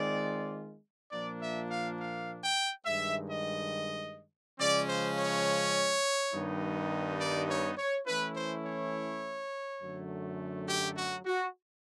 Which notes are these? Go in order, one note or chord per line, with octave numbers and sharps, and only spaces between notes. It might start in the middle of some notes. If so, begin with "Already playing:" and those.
Already playing: D#3 G#3 C4 F4 D5
A#2 F3 A#3 D4 D5
E5
F5
F5
G5
G2 D#3 G#3 E5
D#5
C#3 F3 G#3 C#4 D5
C5
C#5
G2 D#3 G3 B3 D#4
D5
C#5
C#5
E3 A3 C#4 E4 B4
C5
C#5
F#2 D3 F#3 A3
G4
F#4
F#4